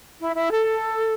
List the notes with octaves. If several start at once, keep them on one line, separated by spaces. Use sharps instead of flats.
E4
E4
A4